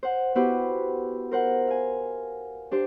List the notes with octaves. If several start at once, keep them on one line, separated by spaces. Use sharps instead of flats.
C5 F#5
B3 E4 F#4 G4 B4 C5
A#4 C5 F#5
F5 G#5
D4 G4 C5